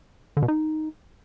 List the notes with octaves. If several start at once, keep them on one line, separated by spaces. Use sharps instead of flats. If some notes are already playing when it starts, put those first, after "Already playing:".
D3
B2
D#4